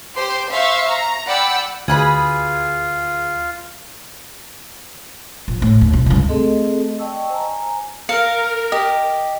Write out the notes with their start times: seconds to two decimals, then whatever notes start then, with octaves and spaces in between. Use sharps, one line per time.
0.16 G4 C5 C6
0.50 C5 E5 F5 C6 C#6
0.89 A#5
1.25 D5 F#5 G5 B5 E6
1.88 D2 F4 G#4 B4 B5
5.48 A#1
5.62 A2
5.81 D#2
5.93 B1
6.06 C#2 G2
6.29 A3 C4 G#4 A4 D#5
6.99 D5 D#5 G5 A5 C#6 E6
7.30 C5 G#5 A#5
8.09 A#4 F5 C#7
8.72 G4 D#5